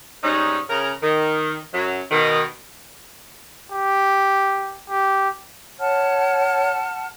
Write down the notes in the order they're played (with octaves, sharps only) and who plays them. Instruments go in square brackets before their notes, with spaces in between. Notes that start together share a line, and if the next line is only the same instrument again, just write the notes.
[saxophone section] G#2 G3 C#4 D#4
C#3 A#4
D#3
F#2 F#3
B2 D#3
[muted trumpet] G4
G4
[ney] C#5 [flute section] F#5 A5 F6